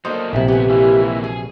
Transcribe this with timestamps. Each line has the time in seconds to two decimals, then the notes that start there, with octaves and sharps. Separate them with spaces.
0.05 F#3 A#3 D4 D#4 F4 A4 C5
0.33 A#1 C3 E4
0.48 D3 B3 G4 G#5
0.69 E3 G#3 A#3 F4
1.24 B2 G#4